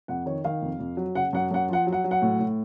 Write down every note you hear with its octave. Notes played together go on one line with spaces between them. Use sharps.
F2 F#5
D#3 C#5
D#3 F5
F2
F2
F#3
C#3 F#5
F#2 F#5
F#2 F#5
F3 F#5
F#3
F#5
F#3
F#5
A2
A2